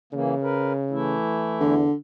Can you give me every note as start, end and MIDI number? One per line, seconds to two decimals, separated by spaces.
0.13 1.15 49
0.13 0.34 52
0.13 0.34 58
0.42 0.73 70
0.42 0.73 71
0.91 1.74 52
0.91 1.74 57
0.91 1.74 64
1.60 1.85 40
1.60 1.93 50